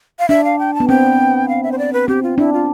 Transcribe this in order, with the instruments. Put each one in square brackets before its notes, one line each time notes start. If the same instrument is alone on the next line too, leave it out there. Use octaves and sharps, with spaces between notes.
[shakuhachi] F5
[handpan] D4 [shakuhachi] E5
[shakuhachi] F5
G5
A5
[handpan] B3
[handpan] C4 [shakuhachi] G5
[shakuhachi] F5
E5
C5
D5
B4
[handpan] C4 [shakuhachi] G4
[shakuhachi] F4
[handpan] D4 [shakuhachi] E4
[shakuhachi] F4